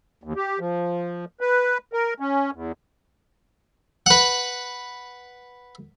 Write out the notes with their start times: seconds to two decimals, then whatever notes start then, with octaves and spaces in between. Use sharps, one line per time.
0.24 D#2
0.36 G4
0.59 F3
1.41 B4
1.93 A#4
2.20 C#4
2.54 E2
4.06 B4 F#5